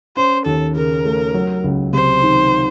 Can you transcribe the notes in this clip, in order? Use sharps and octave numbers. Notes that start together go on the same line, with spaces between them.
C#4 C5
D#2 A4
C#3 A#4
A3
F#3
C#2
C3 C5
D#3